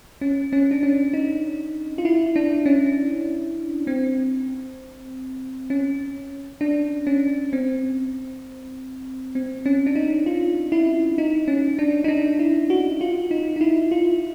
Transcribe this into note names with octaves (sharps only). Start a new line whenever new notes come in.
C#4
C#4
D4
C#4
D#4
F4
E4
D4
C#4
C4
C#4
D4
C#4
C4
C4
C#4
D4
D#4
F4
E4
D#4
C#4
D4
D#4
D4
E4
F#4
F4
D#4
D#4
E4
F4